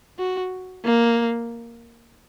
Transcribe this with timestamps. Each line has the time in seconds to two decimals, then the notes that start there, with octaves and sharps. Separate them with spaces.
0.19 F#4
0.85 A#3